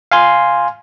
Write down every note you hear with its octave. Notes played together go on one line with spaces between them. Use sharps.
F5 G#5 C6